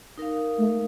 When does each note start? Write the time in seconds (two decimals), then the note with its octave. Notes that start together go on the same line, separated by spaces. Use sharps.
0.18 D#4 A#4 F5
0.58 A3